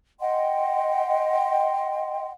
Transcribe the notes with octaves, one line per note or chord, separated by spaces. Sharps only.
D#5 F#5 G5 C6